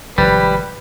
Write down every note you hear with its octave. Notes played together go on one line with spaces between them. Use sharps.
G#1 C3 F3 G3 B4